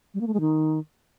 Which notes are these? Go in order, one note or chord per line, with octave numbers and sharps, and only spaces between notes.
G3
A#3
A3
G#3
D#3